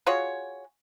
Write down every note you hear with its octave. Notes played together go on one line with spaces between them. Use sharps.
F4 F#4 G#4 C#5